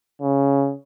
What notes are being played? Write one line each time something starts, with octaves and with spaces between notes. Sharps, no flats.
C#3